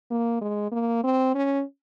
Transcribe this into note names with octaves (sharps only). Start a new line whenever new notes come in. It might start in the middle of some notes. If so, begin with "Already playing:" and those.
A#3
G#3
A#3
C4
C#4